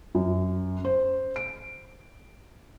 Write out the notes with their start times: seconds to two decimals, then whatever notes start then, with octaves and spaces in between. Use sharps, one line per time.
0.15 F#2
0.85 C5
1.36 D7